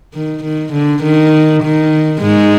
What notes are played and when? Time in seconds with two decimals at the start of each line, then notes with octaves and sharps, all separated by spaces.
0.14 D#3
0.44 D#3
0.73 D3
1.03 D#3
1.63 D#3
2.21 G#2 G#3